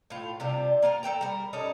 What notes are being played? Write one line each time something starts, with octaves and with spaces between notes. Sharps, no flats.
A2 F4
C3 G3 D4 F4
A#3 F4 G4 A#4
A4 C5 G5 A#5
G3 A#4
G3 C#4 D#4 A4